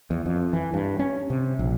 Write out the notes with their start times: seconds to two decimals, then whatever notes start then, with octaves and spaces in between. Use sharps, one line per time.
0.11 E2
0.26 F2
0.53 E3
0.74 G2
0.99 C#4
1.30 C3
1.59 A#1